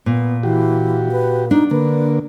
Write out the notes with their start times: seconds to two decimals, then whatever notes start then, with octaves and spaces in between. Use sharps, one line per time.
0.06 A#2 B3
0.43 E3 F#4 G4
1.12 B4
1.51 D4 D#4
1.71 D3 A#3 B4